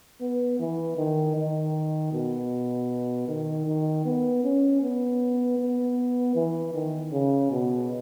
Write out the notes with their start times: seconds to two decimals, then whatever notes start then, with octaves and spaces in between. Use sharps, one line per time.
0.21 B3
0.59 E3
0.97 D#3
1.36 D#3
2.12 B2
3.28 D#3
3.66 D#3
4.05 B3
4.43 C#4
4.82 B3
5.59 B3
6.35 E3
6.74 D#3
7.12 C#3
7.51 B2